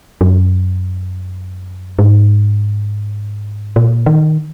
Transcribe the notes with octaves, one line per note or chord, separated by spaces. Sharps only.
F#2
G#2
A#2
D#3